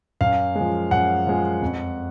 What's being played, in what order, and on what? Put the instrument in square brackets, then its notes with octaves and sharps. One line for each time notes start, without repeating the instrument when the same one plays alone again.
[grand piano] F#2 F5
G#3
F3
F#2 F#5
F3 G#3
F2